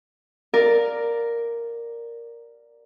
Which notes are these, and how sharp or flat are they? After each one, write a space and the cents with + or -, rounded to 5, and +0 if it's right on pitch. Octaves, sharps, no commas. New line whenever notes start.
A#4 +0 D5 +0 F5 +0